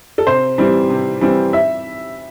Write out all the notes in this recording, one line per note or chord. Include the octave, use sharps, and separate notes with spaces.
A4
C3 C5
E3 G3 C4
C3
E3 G3 C4
E5